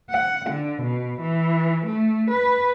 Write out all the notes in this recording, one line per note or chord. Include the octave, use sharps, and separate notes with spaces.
F#5
D3
B2
E3
A3
B4